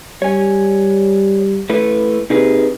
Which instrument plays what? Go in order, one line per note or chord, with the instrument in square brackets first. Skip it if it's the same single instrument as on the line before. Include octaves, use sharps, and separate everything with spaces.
[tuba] G3 [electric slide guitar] C#5 G#5
[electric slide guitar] A3 E4 B4
[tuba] C3 [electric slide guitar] D#4 G#4 B4